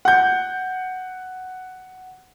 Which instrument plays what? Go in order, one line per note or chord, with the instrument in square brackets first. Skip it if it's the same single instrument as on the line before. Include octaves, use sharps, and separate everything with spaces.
[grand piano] F#5 G6